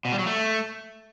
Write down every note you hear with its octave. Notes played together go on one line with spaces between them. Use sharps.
B2
G3
F#3
A3